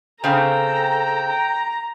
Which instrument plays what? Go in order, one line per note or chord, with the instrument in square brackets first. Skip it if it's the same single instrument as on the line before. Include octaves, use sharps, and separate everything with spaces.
[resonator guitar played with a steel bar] C#3 C4 [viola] A4 A#5 [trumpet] G5
[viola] A#5